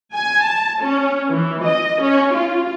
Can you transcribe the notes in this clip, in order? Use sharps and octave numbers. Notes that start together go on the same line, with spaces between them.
G#5
A5
C#4
E3
D#5
C#4
F4